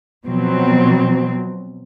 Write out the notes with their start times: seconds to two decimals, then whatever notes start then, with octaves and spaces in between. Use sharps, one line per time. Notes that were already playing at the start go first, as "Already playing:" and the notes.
0.26 B2 F3 F#3 C4